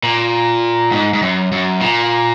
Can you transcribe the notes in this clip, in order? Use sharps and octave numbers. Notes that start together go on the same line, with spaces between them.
A#2
G#2
G#2
F#2
F#2
A#2